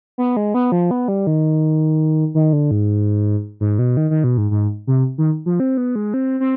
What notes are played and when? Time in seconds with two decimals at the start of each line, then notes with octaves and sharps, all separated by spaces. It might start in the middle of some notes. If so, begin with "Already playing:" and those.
0.18 B3
0.37 G#3
0.54 B3
0.72 F3
0.91 B3
1.08 G3
1.27 D#3
2.35 D#3
2.53 D3
2.71 G#2
3.60 G#2
3.79 B2
3.97 D#3
4.10 D#3
4.24 B2
4.38 G#2
4.51 G#2
4.87 C3
5.18 D#3
5.46 F3
5.60 C4
5.77 B3
5.96 G#3
6.14 C4
6.40 C4